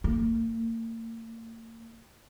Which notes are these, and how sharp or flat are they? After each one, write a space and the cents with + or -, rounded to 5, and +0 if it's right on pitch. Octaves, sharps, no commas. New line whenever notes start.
A#3 -40